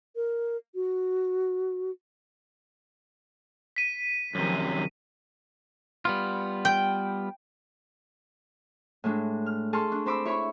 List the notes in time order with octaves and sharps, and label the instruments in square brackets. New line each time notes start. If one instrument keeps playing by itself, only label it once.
[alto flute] A#4
F#4
[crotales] B6 D#7
[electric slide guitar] F#2 C3 [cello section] D#3 F3 F#3
[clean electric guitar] G3 B3 F4
[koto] G5
[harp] A2 G#3 D4
F6
G#4 A4 A5 C6 C#6 F6
D4
C4 C5 B5 D6 E6
E4 C#5 B5 C#6